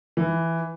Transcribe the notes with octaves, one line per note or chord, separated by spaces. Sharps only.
E3